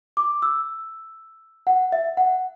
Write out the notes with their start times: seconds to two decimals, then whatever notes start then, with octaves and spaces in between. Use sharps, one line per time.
0.17 D6
0.42 E6
1.67 F#5
1.92 E5
2.17 F#5